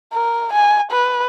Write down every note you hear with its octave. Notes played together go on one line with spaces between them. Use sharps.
A#4
G#5
B4